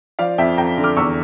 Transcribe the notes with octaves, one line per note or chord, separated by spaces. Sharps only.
F3 D5 F5
F2 E5 G5
F2 G5 A#5
D3
D6 F6
E2 C#6 E6